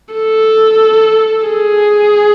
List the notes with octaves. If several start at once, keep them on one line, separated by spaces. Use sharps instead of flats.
A4
G#4